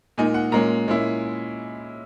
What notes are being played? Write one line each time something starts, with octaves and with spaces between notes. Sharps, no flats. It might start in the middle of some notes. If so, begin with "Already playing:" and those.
A#2 G#3 D#4 G#5
F#5
A#2 G#3 C#4 A#5
A#2 G#3 C#4 E4